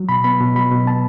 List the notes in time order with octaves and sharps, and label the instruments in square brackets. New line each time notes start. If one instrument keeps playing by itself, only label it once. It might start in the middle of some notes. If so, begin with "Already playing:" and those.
Already playing: [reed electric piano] F#3
B2 B5
B3 B5
B2
F#3 B5
B2
B3 A5